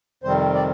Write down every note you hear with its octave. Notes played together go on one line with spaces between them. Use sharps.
F2 C3 D#3 G3 C4 C5
D5